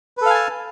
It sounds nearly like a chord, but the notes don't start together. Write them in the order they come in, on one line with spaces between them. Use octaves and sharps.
B4 A4 F5 G#5 A5